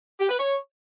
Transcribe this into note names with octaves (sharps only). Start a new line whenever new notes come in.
G4
B4
C#5